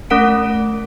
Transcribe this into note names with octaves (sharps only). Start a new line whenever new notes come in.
A3 C#4 A#4 F#5 D7